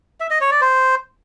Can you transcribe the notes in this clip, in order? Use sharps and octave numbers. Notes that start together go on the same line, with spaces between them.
E5
D#5
C#5
D5
C5